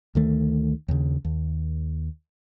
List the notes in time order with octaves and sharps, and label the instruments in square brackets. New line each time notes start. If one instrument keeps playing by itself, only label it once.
[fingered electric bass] D2 D#3 A3
D#2 C#3
D#2